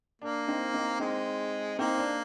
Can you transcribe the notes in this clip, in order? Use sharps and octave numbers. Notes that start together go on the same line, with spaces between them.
A#3 D4
C4 D#4
C4 D#4
G#3 C4 D#4
A#3 C4 D#4
D4